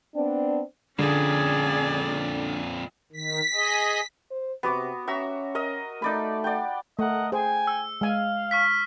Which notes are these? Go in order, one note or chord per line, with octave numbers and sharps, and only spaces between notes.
B3 C4 D4
F2 A#2 D3 C#4 G#4 D5
D#3 B6
G#4 D#5
C5
C3 B3 F#4 D6
C#4 F#4 E5 A#5
A#4 D#5
A3 D#4 D5 B5
D5 F#5 G5
A3 A#4 D#5 F#5
G#4 C5 G5 G#5
E6
G#3 F5 G#5
C#6 F6 B6